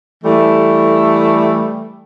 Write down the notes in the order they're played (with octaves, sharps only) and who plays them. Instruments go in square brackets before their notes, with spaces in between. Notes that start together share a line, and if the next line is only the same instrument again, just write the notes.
[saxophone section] E3 G3 A3